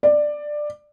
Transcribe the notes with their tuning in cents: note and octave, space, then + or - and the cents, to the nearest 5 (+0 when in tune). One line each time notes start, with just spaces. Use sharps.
D5 +15